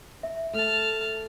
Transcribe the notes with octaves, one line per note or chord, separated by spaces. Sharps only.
E5
A3 A5 F6